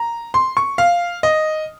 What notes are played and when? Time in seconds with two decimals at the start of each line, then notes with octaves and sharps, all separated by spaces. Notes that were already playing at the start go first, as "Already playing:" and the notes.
Already playing: A#5
0.34 C6
0.57 C#6
0.78 F5
1.23 D#5